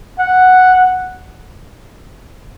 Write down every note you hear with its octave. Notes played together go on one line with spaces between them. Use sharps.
F#5